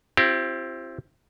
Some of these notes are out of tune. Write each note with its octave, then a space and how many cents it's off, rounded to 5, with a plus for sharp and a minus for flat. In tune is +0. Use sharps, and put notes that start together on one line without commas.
C4 +10 E4 +45 G4 -20